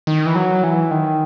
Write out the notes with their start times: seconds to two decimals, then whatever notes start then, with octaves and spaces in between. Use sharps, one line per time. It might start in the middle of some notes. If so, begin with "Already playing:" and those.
0.07 D#3
0.26 E3
0.35 F#3
0.63 E3
0.91 D#3